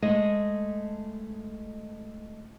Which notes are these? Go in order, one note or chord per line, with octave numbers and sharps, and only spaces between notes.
G#3 A3 D#5